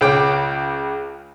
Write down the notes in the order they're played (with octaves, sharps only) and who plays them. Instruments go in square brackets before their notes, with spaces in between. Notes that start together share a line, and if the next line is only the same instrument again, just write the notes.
[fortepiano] C#2 C#3 G5 D6